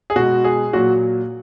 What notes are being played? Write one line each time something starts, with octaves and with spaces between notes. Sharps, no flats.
G#4
B2 G#3 F#4
G#4
A#2 F#3 F#4